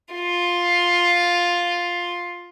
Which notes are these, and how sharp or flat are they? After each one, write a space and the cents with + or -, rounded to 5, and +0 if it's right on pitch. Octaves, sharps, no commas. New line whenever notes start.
F4 +5